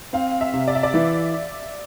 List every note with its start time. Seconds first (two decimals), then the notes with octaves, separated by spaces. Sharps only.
0.13 C4 F5
0.41 E5
0.53 C3
0.68 D5
0.75 E5
0.83 D5
0.94 E3